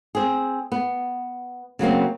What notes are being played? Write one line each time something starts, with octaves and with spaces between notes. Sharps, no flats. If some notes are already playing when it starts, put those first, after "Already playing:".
C4 G#4
B3
C#3 F#3 A#3 C4